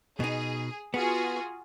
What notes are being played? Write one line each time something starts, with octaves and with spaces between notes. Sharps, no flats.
B2 D#4 G#4
B3 F4 F#4 G#4